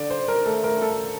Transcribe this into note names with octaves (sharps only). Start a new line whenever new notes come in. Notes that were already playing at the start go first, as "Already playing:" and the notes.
Already playing: D3 D5
C5
A#4
A3 A4
A#4
A4